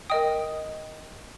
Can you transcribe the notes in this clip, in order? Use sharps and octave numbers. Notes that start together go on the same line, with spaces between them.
A#4 D#5 G5 D#6